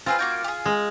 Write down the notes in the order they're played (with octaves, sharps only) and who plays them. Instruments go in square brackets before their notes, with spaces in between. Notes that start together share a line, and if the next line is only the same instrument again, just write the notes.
[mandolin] C4 G#4 B4 [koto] F4
[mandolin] A#3 F#4 G5
G4 G#4
[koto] G#3